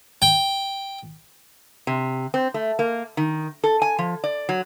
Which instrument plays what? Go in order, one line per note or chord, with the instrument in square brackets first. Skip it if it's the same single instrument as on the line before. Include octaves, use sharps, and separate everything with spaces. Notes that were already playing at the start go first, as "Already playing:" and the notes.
[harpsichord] G5
[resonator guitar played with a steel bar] C3
C4
A3
A#3
D#3
A4
G#5
F3
D5
F#3